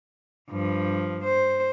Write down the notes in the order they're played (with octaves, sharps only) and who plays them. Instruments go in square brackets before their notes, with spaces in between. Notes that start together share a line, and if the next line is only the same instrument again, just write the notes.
[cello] G2 F3
C5